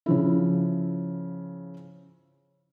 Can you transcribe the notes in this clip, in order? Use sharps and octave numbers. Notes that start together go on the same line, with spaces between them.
C#3 F3 E4